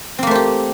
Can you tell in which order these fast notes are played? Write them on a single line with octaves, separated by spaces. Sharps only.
C4 A#3 A3 C5 G4